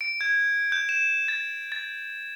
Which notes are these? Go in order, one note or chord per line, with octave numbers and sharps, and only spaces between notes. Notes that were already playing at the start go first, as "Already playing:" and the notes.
D7
G#6
G6
E7
A6
A6